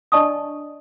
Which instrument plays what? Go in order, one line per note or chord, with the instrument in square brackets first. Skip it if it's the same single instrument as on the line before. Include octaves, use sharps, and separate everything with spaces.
[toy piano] D4 D5 D#5 A5 C#6 D#6